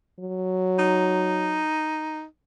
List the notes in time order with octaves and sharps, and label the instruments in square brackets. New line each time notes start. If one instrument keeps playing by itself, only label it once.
[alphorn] F#3
[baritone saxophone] D#4